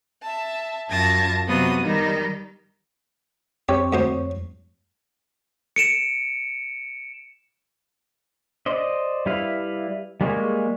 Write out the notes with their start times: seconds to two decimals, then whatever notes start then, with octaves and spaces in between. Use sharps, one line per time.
0.23 E5 A5
0.90 F#2 F4 A5 G#6 A#6
1.47 C3 F#3 B3 F4 D#6
1.81 D#3 G3 D#4
3.69 F2 C4 G4 C#5
3.93 D2 B3 C5
5.76 C#7 D7 E7
8.66 C5 D5 D#5
9.26 G3 E4 B4 F5
10.21 G3 G#3 A#3 G#4 C#5